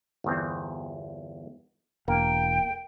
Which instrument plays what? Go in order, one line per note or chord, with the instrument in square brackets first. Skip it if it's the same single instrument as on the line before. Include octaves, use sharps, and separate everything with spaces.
[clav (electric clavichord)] G1 E2 C4
[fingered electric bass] E1 [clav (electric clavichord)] A#3 [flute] G5